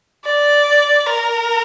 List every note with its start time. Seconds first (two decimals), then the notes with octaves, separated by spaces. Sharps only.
0.25 D5
1.06 A#4